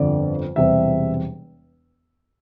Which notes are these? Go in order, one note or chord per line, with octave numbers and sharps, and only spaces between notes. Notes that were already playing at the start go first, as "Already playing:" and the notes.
Already playing: G1 F2 D3 D5
E1 E2 C3 G3 E5